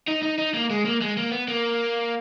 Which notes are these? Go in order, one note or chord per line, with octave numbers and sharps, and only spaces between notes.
D#4
D#4
D#4
A#3
G#3
A#3
G#3
A#3
B3
A#3